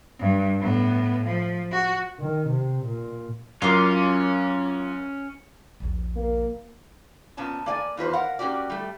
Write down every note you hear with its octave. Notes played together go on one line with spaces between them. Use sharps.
G2
A2 B3
F3
F#4
D#3
C3
A#2
F#2 A#3 C#4 F4
A#1 D#2
A#3
A#2 B3 C#4 A5
A#3 D5 G#5
E2 F4 B4 C5
A#4 F5 F#5
A#3 C#4 F#4 G4 D5
G3 A3